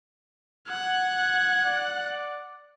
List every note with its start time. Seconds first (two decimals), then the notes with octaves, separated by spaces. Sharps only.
0.68 F#5 G#6
1.65 D5